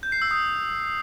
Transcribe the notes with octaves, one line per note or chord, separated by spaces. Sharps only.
G6
C7
E6
D#6